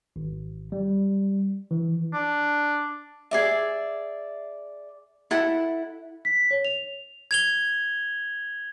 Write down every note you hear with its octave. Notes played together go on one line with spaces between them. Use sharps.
G#1
G3
E3
D4
G#4 D5 E5
E4 A4 F#5 B5
B6
C#5
F7
G#6 F7 G7